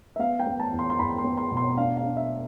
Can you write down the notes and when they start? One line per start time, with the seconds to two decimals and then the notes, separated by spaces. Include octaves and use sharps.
0.16 E5
0.19 B3 F5
0.39 G5
0.47 B3
0.60 A5
0.72 E2
0.79 C6
0.90 C6
0.99 E2 B5
1.18 C6
1.24 B3
1.37 C6
1.51 B2
1.57 C6
1.77 D4 F5
1.97 F5
2.03 D4
2.17 E5